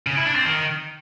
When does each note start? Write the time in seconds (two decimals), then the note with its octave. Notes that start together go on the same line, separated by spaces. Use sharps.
0.07 C#3
0.16 E4
0.26 D4
0.36 C4
0.45 D#3